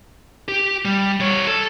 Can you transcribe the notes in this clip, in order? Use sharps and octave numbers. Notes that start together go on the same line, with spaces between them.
G4
G3
G3 C#5
A4